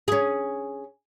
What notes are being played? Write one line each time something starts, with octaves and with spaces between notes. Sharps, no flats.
C#4 G#4